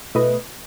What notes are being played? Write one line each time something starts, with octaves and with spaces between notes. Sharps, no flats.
B2 A3 E4 B4 D#5